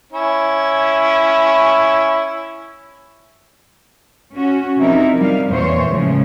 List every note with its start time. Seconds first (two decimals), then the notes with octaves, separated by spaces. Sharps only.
0.12 C#4 E4
4.33 C#4 F#4
4.77 C3 F3 D#4 E4 A#4
5.18 G3 F5
5.50 E2 A#2 E3 C5 C#5
5.89 A2 C#3 F3 G#3